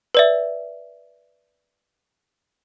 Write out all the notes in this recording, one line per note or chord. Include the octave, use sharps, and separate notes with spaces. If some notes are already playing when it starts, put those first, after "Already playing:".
B4 D5 E5